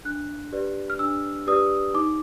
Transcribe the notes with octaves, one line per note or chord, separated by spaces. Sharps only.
D4 F#6
G4 B4 D5
F6
D4 E6
G4 B4 D5 D#6
D#4 D6